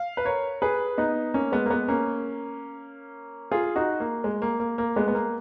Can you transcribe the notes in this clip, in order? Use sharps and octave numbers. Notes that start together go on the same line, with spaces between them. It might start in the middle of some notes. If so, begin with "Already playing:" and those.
Already playing: F5
B4
A#4 C#5
G#4 B4
B3 D#4
A#3 C#4
G#3 B3
A#3
G#3 B3
A#3 C#4
F4 G#4
D#4 F#4
A#3
G#3
A#3
A#3
A#3
G#3 B3
B3
A#3